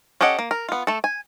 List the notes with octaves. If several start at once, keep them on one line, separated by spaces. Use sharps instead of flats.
C#4 G4 A4 D#5 F#5
A#3
A#4
B3 F4
A3 A4
G#5